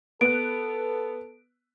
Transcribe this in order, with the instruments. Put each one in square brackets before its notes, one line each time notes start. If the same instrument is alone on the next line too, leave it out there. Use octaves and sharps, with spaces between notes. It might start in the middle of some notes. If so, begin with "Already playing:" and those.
[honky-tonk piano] B3 F#6 [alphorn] A4 [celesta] D7